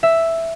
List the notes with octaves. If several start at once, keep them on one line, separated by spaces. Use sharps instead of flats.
E5